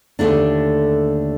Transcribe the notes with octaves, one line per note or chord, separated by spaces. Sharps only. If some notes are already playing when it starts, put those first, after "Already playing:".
D#2 D3 A3 D4